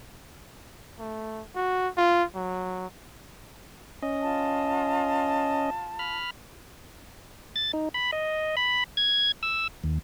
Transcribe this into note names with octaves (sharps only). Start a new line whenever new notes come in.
A3
F#4
F4
F#3
C#4 D#5
F4 A5
B5 F6
A6
D#4
B5
D#5
B5
G#6
E6
D#2